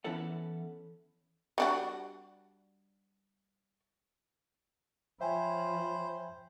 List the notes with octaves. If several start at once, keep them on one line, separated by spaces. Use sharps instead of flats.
E3 B3 C#4 E4 A4 F#5
G3 D4 F#4
F3 C5 C#5 E5 G5 G#5 B5